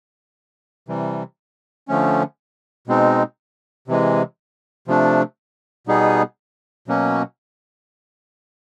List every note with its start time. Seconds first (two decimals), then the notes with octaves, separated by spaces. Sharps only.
0.88 C3 E3 G3
1.88 D3 F3 A3 C#4
2.88 B2 G#3 C4 D#4
3.88 C3 E3 G#3
4.88 C3 F3 A3 D4
5.87 B2 G3 B3 D#4 G#4
6.88 B2 F#3 A#3 C#4